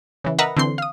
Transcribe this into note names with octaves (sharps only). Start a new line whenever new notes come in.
C#3 E3
A#4 B4 D#5 E5 F#5 A#5
D3 E3 C4 C6
F5 D#6